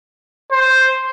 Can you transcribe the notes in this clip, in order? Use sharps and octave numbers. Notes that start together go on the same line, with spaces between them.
C5